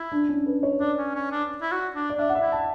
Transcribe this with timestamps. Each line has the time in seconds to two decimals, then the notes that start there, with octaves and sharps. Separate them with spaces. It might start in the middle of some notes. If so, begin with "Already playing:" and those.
Already playing: E4
0.12 D4
0.29 C#4
0.46 B4
0.63 C#5
0.80 D4 D5
0.98 C#4
1.15 C#4
1.32 D4
1.62 E4
1.72 F#4
1.95 D4
2.10 D5
2.18 D4 E5
2.29 F#5
2.35 E5
2.41 E4
2.52 A5